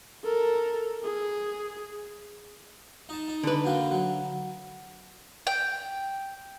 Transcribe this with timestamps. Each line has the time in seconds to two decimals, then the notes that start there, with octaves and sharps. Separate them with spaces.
0.24 A4 A#4
1.03 G#4
3.09 D#4 A5
3.28 D#4
3.43 D3 B4
3.64 F#3 A#3 G5
3.91 F#3
5.47 G5